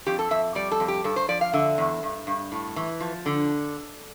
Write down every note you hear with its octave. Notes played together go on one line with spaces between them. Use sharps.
F2 G4
A4
F2 E5
G3 D5
A4
F2
G4
G2 A4
C5
F3 D5
F5
D3 E5
E2
G2
G2
A2
E3
F3
D3